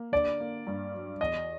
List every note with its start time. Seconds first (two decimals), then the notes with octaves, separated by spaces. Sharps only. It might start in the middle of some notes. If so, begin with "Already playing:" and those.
Already playing: A#3
0.12 D3 D5
0.40 A#3
0.67 G2
0.94 F#3
1.21 E2 D#5